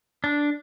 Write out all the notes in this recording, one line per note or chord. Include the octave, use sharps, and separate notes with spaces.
D4